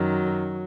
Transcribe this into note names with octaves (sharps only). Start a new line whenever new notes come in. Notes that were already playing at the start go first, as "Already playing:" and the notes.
Already playing: F#2 D#3 F#3